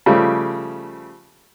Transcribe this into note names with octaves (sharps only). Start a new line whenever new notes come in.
C#3 F3 G3 A3